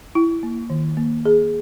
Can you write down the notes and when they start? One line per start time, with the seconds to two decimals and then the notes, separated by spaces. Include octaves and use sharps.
0.15 E4
0.43 A#3
0.70 D#3
0.97 A#3
1.25 G#4